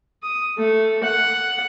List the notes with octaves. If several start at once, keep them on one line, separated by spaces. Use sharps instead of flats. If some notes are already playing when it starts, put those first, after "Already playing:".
D#6
A3
F#5